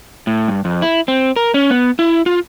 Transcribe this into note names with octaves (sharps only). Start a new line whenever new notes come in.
A2
G2
F2
E4
C4
A#4
C#4
B3
E4
F4